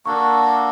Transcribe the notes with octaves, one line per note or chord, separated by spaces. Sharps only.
A#3 D4 F#4 A4 C#6